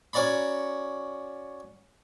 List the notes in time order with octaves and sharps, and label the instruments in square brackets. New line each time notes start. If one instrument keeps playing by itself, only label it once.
[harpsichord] C#4 F#4 D5 A#5 B5